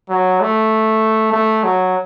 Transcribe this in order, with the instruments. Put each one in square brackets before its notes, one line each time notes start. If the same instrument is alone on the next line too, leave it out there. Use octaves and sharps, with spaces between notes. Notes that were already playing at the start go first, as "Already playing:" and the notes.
[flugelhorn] F#3
A3
A3
F#3